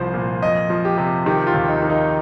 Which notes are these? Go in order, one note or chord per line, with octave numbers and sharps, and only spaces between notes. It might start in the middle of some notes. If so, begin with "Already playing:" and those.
Already playing: C2 F3 C5
A#2
F2 D#5
F3
G4
C3
D#3 G4
F4
D#2
D#4
D#3
D#4